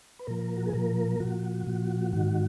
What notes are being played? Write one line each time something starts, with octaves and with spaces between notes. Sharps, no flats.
B4
A#2 F3 A#4
F#4
G#4
A#2 F3 A#4
A#2 F3 F#4
A#2 F3
G#2 D#3 F#4